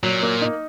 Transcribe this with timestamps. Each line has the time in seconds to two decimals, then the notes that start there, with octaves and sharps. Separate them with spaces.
0.03 A#2 F#3
0.23 A#3
0.41 D#4